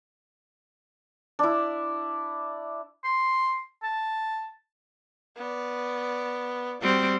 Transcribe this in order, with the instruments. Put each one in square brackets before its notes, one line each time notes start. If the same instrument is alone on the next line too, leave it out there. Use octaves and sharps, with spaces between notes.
[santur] D4 E4
[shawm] C6
A5
[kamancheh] B3 D5
[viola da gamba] G3 C4 [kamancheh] F#4